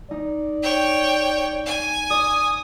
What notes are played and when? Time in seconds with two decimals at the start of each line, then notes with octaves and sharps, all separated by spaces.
0.11 D#4 D5
0.63 C#5 G5
1.66 G#5
2.10 D5 D#6